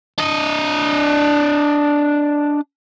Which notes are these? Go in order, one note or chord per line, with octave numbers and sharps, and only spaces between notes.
D4 D#5